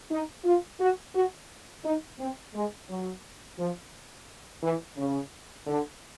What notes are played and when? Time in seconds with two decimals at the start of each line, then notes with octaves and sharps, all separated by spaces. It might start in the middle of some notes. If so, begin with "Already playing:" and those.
0.10 D#4
0.45 F4
0.79 F#4
1.14 F#4
1.84 D#4
2.19 C4
2.54 G#3
2.89 F#3
3.58 F3
4.63 E3
4.97 C#3
5.67 D3